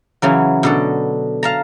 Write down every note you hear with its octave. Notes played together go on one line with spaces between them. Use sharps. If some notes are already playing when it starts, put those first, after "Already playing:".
C#3 E3 F#3
B2 D3 A4
F5 A5 A#5